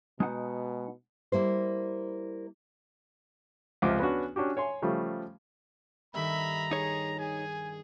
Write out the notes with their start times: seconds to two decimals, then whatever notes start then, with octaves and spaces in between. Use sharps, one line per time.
0.20 B2 G#3 D#4 F#5
1.32 G3 A#3 E4 C5
3.82 C#2 C3 F3 D6
3.99 B3 C#4 D4 F#4
4.36 C#4 D4 F#4 G4
4.57 C#5 G#5 C6
4.82 C#3 F3 G3 A3
6.15 G2 D#3 A4 E5 A#5 B5
6.71 D#4 G#4 C#5
7.19 G#4 G#5